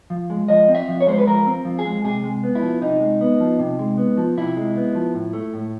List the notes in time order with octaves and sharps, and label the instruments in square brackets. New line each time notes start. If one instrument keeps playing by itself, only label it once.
[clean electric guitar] F3
G#3
F3 D#5
C4
E5
F3
C#5
G#3 C5
B4
F3 A#4
C4
F3
G#4
G#3
C3 G#4
G#3
B3
E4
F3
C3 D#4
G#3
B3
F3
C3
G#3
B3
F3
C3 E4
G#3
B3
F3
A2
A3
A2